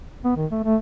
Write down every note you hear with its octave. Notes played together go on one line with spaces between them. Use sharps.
B3
D#3
A3
A3